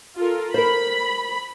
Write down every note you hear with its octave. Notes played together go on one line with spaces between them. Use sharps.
F4 A4 A#4
A#4 C5 B5